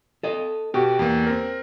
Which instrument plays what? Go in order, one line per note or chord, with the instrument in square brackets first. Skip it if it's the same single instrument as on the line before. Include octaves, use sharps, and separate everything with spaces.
[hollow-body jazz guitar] A4 D#5
[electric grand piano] B2 F#4 [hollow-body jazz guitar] G4
[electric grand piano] E2 A#3
C4 A#4